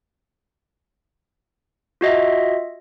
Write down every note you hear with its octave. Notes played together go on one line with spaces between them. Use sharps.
F4 F#4 D#5 E5